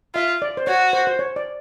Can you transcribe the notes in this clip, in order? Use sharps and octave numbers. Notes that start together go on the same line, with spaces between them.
F4 E5
D5
C5
F#4 C#5
C5
C5
C#5
D5